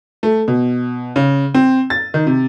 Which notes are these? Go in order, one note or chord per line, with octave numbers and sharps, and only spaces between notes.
A3
B2
C#3
C4
A6
D#3
C3